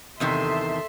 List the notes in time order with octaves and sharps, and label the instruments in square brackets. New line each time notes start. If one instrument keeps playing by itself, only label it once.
[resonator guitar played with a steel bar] E2 C3 D#3 [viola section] A4 E5 C6